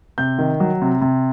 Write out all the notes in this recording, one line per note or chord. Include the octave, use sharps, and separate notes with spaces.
C3 G6
D#3
F#3
C3
C3